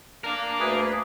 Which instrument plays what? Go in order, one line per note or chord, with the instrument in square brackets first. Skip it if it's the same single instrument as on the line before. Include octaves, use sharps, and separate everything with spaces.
[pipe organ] A#3 D4 [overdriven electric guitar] A#4 F5
[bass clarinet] D2 [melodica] G#4 B4